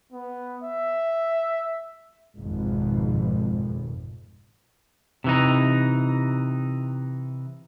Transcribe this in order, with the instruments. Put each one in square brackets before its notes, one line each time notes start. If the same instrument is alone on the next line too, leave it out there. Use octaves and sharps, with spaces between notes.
[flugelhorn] B3
E5
[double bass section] G#1 F2 B2
[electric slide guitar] C3 E3 D#4